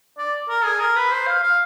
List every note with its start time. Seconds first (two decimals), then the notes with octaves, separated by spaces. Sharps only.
0.18 D5
0.49 A#4
0.64 G#4
0.80 A#4
0.96 B4
1.12 C5
1.27 F5
1.43 F5